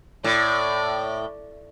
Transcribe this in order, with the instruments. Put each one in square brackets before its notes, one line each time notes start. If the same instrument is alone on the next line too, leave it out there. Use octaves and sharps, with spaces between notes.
[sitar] A2 [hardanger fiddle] D5